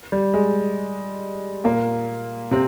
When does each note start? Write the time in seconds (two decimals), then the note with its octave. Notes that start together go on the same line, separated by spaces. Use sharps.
0.12 G3
0.34 G#3
1.64 A#2 A#3
2.51 C3 C4